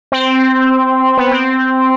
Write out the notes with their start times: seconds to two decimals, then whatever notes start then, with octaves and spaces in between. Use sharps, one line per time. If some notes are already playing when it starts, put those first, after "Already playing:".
0.12 C4
1.17 B3
1.31 C4